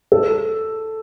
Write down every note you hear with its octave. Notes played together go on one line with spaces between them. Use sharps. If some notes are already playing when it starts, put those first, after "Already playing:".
A4